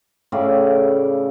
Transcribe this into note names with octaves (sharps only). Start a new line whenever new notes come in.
A2 C#3 D5 F5